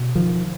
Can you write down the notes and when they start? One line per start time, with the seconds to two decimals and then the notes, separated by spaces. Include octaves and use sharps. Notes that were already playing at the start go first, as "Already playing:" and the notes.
Already playing: B2
0.15 D#3 F3